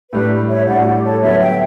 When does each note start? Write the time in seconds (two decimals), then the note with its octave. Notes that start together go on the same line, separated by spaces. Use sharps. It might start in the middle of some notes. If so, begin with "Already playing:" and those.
0.12 A2 G3 D4 B4
0.49 C#5 E5
0.67 A2 G3 D4 D5 F#5
0.79 F#4
0.86 G4
1.04 A4 C#5
1.22 D3 F#3 B3 C#5 E5
1.41 E5 G5